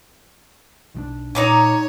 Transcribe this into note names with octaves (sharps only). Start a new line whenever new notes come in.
B1 F3 D4
A#2 D#4 C#5 A#5 D6